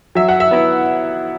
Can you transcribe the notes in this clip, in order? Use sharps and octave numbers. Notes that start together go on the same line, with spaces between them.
F#3 E5
F#5
E5
B3 E4